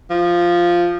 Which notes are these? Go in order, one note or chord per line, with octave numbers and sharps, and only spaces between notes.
F3